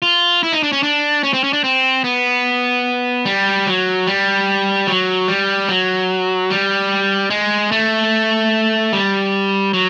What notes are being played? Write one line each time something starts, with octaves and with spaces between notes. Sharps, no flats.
F4
E4
D#4
D4
C#4
D4
C#4
C4
C#4
D4
C4
B3
G3
F#3
G3
F#3
G3
F#3
G3
G#3
A3
G3
F#3